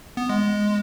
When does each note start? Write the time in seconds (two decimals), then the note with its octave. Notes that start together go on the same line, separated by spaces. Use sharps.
0.17 B3
0.29 G#3